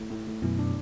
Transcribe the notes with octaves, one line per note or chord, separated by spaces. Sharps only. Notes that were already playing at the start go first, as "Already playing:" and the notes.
Already playing: A2
A2
A2
F#2 B2 E3
D4